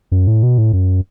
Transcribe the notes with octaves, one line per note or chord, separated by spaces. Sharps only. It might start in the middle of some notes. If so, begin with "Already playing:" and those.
F#2
A2
B2
A2
F#2